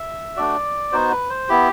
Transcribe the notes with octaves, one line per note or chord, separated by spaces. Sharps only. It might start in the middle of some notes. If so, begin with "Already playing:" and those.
Already playing: E5
A3 D4 F#4 D5
B3 D#4 F#4 C5
B4
C5
B3 E4 G4